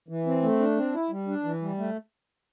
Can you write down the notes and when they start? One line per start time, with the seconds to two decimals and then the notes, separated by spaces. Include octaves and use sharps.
0.08 E3
0.26 C4
0.43 A3
0.60 D4
0.77 C4
0.94 E4
1.10 G3
1.28 D4
1.44 E3
1.62 G3
1.78 A3